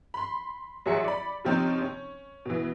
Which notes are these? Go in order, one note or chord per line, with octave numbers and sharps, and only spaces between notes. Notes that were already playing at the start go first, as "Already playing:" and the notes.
B5 C6
A1 F#3 G#4 E5 C#7
D5 B5
C3 F3 C4 C#4 D#4
C#4
B2 E3